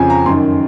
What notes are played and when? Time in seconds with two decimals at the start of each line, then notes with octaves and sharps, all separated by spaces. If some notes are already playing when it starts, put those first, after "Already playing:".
Already playing: F2 C#3 F3 G#5
0.10 A#5
0.26 F#2 D#3 C6